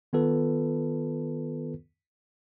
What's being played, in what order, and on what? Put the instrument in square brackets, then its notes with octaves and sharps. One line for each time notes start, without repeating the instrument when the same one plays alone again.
[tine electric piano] D#3 B3 F4 A4 B4